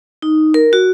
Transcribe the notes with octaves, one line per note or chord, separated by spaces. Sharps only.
D#4
A#4
F#4